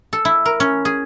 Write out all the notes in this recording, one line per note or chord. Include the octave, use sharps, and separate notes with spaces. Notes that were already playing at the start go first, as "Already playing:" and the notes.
A4
E4
A#4
C#4
G#4